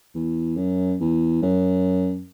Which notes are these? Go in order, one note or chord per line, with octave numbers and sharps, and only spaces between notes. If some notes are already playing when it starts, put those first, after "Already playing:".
E2
F#2
E2
F#2